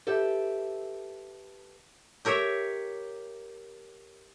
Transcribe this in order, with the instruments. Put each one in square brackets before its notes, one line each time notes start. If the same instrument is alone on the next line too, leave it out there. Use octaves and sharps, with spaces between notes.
[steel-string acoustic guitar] G4 A4 B4 E5
[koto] G4 A#4 C#5 E5